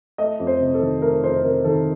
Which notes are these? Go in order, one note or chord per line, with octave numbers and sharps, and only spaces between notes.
A3 D#5
F2
C5
C3
A4
D#3
A3 A#4
F2 C5
C3 A#4
D#3 A4